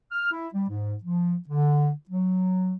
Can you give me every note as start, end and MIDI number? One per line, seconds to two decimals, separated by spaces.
0.12 0.29 89
0.32 0.48 64
0.54 0.65 55
0.69 0.95 44
1.04 1.36 53
1.48 1.91 50
2.10 2.74 54